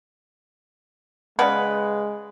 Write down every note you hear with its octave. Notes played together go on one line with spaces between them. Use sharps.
C#3 G#3 B4 D5 F#5